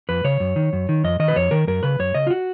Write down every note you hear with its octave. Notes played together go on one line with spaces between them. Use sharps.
F2 B4
C#3 C#5
F#2
D#3
F#2
D#3
F2 D#5
D#3 D#5
B4
F2 C#5
D#3 A#4
F#2 A#4
C#3 B4
F#2 C#5
C#3 D#5
F4
F#4